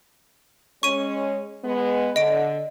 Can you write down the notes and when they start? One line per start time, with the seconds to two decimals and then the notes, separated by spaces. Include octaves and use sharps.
0.83 G#3 C#4 C#6 D#7
1.64 G#3 B3
2.16 D3 D#5 D7